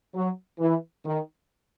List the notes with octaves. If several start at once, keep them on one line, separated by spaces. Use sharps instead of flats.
F#3
E3
D#3